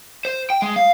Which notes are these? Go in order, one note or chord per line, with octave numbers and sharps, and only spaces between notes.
C5
G5
G#3
F5